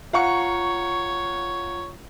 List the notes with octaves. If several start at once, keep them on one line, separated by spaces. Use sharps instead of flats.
F4 C#5 F5 F#5 A#5 C#6 C#7